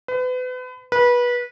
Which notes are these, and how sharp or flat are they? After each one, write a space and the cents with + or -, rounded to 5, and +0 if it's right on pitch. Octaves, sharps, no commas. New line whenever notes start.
B4 +35
B4 -25